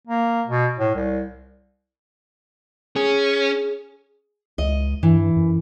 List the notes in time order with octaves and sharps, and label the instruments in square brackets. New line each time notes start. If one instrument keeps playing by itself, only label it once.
[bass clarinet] A#3
B2
A2
C2
[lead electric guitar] C#4 [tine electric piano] G#4
[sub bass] C#2 [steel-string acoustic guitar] D#5
[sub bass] G2 [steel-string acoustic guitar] E3
[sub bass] F#2